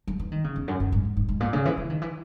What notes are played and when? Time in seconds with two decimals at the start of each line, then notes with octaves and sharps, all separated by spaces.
0.07 F#3
0.19 E3
0.32 D#3
0.44 C#3
0.56 E2
0.68 F#2
0.80 F#2
0.92 G#2
1.05 G#2
1.17 G#2
1.29 G#2
1.40 A#2
1.53 C#3
1.65 E3
1.77 E3
1.90 D#3
2.02 E3